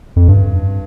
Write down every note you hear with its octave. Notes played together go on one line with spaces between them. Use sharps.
F2
G2